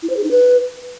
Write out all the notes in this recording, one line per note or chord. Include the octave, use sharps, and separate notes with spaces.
E4
C5
G#4
D#4
B4